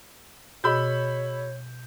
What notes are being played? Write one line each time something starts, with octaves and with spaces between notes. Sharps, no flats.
B2 F#4 G#4 C#5 D#5 B5 E6 G6